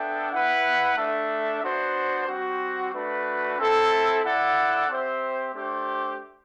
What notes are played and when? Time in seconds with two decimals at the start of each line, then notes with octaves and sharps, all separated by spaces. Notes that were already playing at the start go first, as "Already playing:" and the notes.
Already playing: B3 D4 A4 E5 G5
0.31 E4 B4 F#5
0.96 A3 D4 A4 E5
1.61 B3 D4 F#4 C5
2.27 G3 C4 F#4
2.93 A3 D4 F#4 B4
3.57 C4 E4 A4 E5
4.23 E4 A4 D5 F#5
4.88 C4 G4 C5 E5
5.53 A3 D4 G4 C5